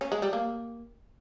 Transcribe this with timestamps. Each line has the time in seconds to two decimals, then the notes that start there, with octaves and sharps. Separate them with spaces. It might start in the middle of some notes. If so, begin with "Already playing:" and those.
0.01 C#4
0.12 G#3
0.22 G3
0.33 A#3